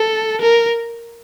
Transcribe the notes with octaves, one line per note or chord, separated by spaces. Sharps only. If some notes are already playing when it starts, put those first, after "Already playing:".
Already playing: A4
A#4